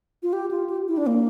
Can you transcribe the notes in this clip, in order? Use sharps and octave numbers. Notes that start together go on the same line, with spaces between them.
F4
G4
F4
G4
E4
D4
A#3